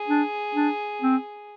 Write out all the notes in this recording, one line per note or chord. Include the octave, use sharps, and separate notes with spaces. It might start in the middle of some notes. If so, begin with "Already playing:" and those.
Already playing: G#4
D4
D4
C4